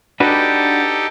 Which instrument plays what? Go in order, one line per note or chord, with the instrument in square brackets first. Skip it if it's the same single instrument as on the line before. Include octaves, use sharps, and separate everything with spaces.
[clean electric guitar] D4 F#4 B4 [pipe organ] D#4 G4 A4